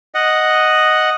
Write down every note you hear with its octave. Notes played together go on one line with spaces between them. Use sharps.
D#5 F#5